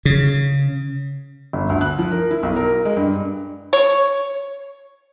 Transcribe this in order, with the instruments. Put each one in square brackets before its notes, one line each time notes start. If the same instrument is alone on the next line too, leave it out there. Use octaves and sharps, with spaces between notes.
[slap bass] C#3
[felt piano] G1
D2
F#6
F3
A#4
E4
B1
A#4
G#3
G2
[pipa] C#5